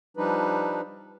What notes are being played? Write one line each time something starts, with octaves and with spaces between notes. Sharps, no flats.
F3 G3 D4 D#4 B4